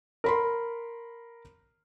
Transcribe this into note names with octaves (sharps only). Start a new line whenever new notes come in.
A#4 B5 C6